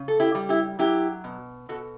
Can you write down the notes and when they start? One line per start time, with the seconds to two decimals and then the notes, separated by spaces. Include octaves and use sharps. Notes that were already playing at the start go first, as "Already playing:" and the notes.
Already playing: C#3
0.08 A4
0.20 E4 G4
0.35 G3
0.49 E4 G4
0.79 F#3 E4 G4
1.24 B2
1.69 B2 F#4 A4